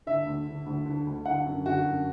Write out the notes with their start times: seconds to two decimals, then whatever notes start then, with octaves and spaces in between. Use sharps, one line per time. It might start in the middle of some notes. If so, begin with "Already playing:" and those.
0.07 D3 E5
0.26 D2
0.47 D3
0.66 D2
0.86 D3
1.07 D2
1.26 D3 F#5
1.46 F#2
1.66 D3 F#4
1.86 F#2